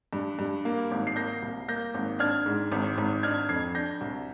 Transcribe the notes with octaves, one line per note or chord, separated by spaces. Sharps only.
G2
G2
A#3
G#1
C7
A#3 G6 A#6
C2
A#3 G6 A#6
G#1
D4 F6 G#6
G#2
G#1
G#1
D4 F6 G#6
F2 G#6 C7
D4 G6 A#6
C2